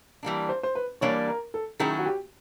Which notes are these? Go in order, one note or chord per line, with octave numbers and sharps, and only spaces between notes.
E3 G3 A#3 D4
C5
C5
B4
E3 G3 A#3 D4 C#5
A#4
A4
D#3 F#3 A3 C#4 E4 G#4
F#4
G4